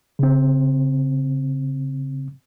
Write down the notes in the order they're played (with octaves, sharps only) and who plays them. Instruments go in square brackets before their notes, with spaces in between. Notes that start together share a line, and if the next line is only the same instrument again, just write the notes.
[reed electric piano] C#3 C4